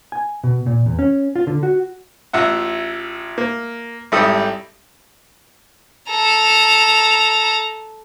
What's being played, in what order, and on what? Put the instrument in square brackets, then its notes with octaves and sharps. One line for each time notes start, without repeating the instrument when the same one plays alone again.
[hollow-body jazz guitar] G#5
B2
A#2
E2
C#4
F4
D3
F#4
[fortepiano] A1 F4 E5 F#5
A#3
G#1 G3 E4 G4 A4 D#6
[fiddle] A4 A#5